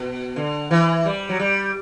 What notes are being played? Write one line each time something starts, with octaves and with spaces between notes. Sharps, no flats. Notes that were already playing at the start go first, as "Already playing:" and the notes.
Already playing: B2
D3
E3
G3
F#3
G3